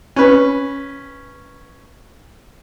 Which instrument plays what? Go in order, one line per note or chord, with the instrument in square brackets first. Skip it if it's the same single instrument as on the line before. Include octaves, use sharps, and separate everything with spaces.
[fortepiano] C#4 B4